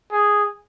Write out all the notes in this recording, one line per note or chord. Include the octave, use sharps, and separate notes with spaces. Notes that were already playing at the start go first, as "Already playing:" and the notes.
G#4